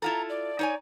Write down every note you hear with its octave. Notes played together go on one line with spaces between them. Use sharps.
E4 F4 A4 A#5
D5
D#4 C#5 G#5